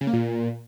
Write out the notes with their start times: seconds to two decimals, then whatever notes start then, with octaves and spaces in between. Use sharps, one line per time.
0.01 C#3
0.07 A#3
0.13 A#2